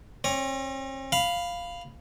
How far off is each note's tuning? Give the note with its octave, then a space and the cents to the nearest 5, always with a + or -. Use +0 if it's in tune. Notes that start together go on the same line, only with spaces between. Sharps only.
C4 +45 C#5 +30
F5 +0 B5 +5